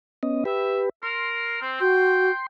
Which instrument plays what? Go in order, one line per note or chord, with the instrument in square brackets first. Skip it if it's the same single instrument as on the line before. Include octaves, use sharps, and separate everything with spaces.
[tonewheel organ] B3 C#4 D#5
[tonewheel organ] G4 B4 [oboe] E5
[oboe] A#4 [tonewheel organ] C6
[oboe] C4
[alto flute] F#4 [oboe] G5